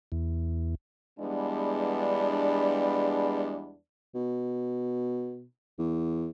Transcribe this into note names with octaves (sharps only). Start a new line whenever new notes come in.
E2
E2 G3 G#3 B3 D4
B2
E2